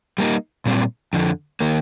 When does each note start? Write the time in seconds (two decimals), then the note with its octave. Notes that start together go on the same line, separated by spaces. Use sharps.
0.18 G3 A#3 D#4
0.66 A#2 G3 C4
1.13 F2 D3 F3
1.61 D#3 A#3